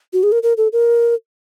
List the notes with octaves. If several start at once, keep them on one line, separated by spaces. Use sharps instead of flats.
F#4
G#4
A#4
A#4
A4
A#4